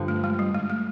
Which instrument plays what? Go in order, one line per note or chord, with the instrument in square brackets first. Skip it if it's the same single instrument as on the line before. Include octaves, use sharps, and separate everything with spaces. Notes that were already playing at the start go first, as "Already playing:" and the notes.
Already playing: [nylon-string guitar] G2 D3 F3
[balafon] A3
G#3
G3
G#3
A3